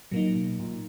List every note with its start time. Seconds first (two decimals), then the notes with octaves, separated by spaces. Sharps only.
0.11 A#2 F#3 A#3 D#4
0.35 B2
0.60 A#2